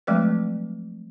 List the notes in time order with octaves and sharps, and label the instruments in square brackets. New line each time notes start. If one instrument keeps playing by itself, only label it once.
[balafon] F3 F#3 G#3 A3 C4 B4